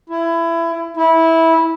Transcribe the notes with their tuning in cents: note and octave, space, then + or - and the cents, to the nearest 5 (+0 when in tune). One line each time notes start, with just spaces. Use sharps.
E4 +20
E4 -15